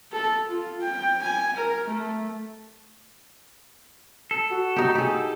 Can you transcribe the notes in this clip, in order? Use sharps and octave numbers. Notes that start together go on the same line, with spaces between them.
A4
F4
G5
G#5
A#4
A3
A4
F#4
D#4 G4
G4 G#4